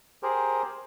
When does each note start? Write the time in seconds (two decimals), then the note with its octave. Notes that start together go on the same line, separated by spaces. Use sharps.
0.23 G4 G#4 A#4 C5